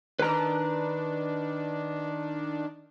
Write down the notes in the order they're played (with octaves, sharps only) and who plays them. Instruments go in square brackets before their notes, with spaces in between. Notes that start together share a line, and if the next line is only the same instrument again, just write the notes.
[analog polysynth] D#3 D4 [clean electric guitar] B4 A#5